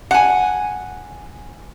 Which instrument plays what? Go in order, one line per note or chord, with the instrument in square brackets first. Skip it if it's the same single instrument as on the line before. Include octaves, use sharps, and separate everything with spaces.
[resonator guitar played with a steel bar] F#5 G#5